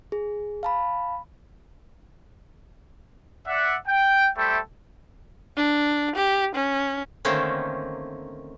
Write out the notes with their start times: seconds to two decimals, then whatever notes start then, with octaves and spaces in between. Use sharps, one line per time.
0.12 G#4
0.63 F5 A5 B5
3.47 D5 E5 F#5
3.86 G5
4.37 G3 A3 A4 C5 E5 G5
5.57 D4
6.16 G4
6.55 C#4
7.25 D3 D#3 A3 A#3 C4 C#4